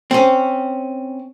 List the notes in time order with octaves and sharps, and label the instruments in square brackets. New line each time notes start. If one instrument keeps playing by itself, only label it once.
[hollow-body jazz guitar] C4 C#4